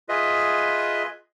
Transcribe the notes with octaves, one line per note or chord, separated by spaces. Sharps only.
F4 G#4 B4 D#5 E5